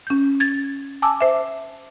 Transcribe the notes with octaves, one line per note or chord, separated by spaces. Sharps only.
C#4 G6
G#6 A6
G#5 A5 D6 E6
C5 E5